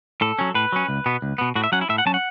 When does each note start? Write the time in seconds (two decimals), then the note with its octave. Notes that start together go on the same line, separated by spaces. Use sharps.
0.21 A2 A4
0.39 F#3 C#4
0.54 A2 B4
0.72 F#3 C#4
0.89 C#2
1.06 B2 B3
1.22 C#2
1.38 B2 B3
1.55 A2 F#4
1.64 E5
1.72 F#3 C#4 F#5
1.81 E4
1.89 A2 E5
1.98 F#5
2.06 F#3 C#4 A5
2.14 F#5